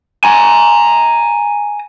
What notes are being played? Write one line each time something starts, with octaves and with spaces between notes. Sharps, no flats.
G#5 A#5